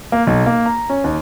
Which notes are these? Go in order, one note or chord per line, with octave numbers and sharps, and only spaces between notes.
A#3
B1
A#3
A#5
C#4
D#2